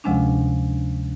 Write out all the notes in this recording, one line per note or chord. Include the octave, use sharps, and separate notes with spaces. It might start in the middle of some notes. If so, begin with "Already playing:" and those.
D2 C3 F3 G#3 C#4 D4